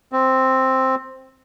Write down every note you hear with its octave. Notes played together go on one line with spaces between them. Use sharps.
C4